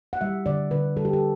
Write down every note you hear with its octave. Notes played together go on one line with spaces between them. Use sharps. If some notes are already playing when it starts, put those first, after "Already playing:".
F#5
G3 E5
D3 D5
D3 B4
G3 A4
G4
A4